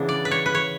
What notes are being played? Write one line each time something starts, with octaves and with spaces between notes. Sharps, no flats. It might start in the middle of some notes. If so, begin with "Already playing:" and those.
Already playing: C#3 E3 B3 D4
D5
B4
C#5
B4
C#5